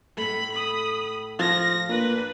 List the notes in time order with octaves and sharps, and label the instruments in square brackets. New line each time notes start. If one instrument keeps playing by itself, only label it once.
[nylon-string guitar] A2 A3 [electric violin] B5
[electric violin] B5 D#6
[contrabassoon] F3 [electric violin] A#6
[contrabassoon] A#2 [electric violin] D4 B4